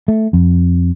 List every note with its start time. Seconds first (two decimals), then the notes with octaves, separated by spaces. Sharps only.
0.08 A3
0.33 F2